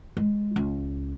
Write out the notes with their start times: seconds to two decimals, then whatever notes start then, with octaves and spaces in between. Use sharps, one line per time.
0.17 G#3
0.56 C#2